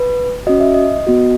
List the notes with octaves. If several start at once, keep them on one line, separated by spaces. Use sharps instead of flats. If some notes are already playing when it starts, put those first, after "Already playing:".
Already playing: B4
C#4 F#4 D#5
E5
D#5
B3 F#4